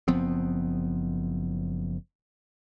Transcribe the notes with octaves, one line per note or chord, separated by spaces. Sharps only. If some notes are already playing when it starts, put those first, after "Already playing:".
F#1 F3 B3 C4